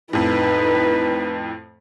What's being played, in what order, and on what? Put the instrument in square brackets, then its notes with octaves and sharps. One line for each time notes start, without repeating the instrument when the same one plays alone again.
[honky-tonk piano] F2 A2 [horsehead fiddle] D#4 B4